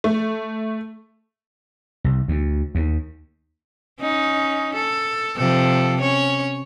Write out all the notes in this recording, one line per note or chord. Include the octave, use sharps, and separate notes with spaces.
A3
C2
D2
D#2
C#4 D#4
A4
C3 F3 A4
C#4 C#5